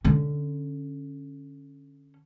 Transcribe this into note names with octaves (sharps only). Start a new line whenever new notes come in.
D3 C#4